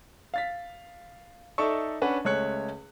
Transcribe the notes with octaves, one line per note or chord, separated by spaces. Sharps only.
F5 A6 B6
D#4 A4 D5 E5 C#6
C#4 D4 B4 F#5
C#2 A3 C#4 C#5 F#6 C#7